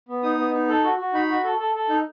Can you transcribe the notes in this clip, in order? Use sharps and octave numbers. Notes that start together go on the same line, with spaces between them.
B3
D#4 D#6
B3
D#4
A4
F#4
F#4
D#4 B5
F#4
A4
A4
A4
D#4